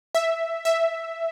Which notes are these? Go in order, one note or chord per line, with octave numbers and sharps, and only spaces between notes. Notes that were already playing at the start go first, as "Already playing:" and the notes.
E5
E5